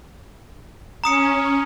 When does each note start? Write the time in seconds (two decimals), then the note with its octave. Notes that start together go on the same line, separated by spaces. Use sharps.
1.04 C#4 A#5 D#6 C#7